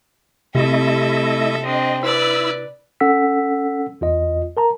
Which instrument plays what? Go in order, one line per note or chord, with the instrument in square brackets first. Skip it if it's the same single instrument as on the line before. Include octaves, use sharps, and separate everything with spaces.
[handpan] C3 [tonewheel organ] A3 E4 D#5 [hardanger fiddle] A4 E5
[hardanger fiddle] C4 D4 [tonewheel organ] D#5
[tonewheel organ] E4 E6 [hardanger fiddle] B4 D5
[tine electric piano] C#4 A4 F#5 E6 B6
E2 F4 D#5
A#4 A5 A#5